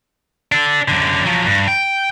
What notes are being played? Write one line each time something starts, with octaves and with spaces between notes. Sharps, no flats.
D4 A4
F#2 D3
F3 F#3
G2
G5